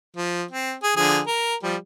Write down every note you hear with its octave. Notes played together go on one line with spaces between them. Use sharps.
F3
C4
G#4
D3 F3 G#4
A#4
F3 G3